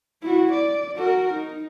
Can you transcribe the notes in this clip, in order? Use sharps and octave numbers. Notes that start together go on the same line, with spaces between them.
E4 F#4
D5
F#4 A#4
D#4